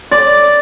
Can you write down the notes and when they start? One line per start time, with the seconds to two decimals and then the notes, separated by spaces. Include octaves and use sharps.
0.11 D5